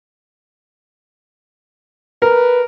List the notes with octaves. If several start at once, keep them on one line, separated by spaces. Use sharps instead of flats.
A#4 B4